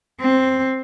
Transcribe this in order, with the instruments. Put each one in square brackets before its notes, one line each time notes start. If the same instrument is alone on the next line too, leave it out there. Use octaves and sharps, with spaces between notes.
[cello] C4